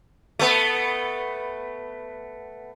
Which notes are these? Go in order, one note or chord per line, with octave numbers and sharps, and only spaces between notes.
A3 B3